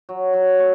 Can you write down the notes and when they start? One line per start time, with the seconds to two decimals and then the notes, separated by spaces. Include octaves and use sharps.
0.09 F#3
0.34 F#3
0.59 A3